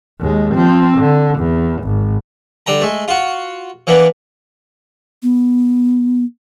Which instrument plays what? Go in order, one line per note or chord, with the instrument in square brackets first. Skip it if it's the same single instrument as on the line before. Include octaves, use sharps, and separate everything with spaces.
[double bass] D#2 G#3
F3 C4
D3
E2
G#1
[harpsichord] D3 G3 G5 A#5
G#3 A3
F4 F#4
E3 A#3 B3 D4
[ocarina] B3